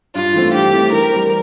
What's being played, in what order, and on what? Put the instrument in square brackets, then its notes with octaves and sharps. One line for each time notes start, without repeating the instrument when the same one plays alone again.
[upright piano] G2 [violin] F4
[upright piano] E3 A3 C4
[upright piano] G2 [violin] G4
[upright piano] E3 A3 C4
[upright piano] E3 [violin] A#4
[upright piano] G3 C4